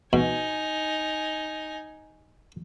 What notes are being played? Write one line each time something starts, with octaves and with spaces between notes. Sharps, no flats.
B2 D#4 G#5